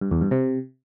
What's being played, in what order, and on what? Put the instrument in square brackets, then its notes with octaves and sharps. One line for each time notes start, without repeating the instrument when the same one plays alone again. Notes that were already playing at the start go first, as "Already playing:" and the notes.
[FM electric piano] G2
E2
G2
C3